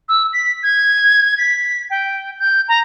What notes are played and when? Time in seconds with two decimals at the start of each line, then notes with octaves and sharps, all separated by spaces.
0.09 E6
0.33 B6
0.63 G#6
1.38 B6
1.90 G5
2.39 G6
2.68 A#5